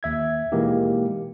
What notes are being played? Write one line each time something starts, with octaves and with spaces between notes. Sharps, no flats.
D#2 E5 G#6
B2 E3 G#3 A#3 D#4 G4